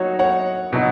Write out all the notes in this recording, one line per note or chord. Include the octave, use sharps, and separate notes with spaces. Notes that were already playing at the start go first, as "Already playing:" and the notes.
Already playing: F#3 D#4 F#4 C#5
C#5 F#5
B2 F#3 D#4